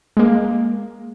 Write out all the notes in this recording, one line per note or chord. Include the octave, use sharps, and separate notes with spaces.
G#3 A#3